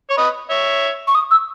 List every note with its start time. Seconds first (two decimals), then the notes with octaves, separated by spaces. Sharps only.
0.10 C#5
0.17 B4 D#5
0.50 C#5 E5
1.07 C#6
1.15 D#6
1.31 E6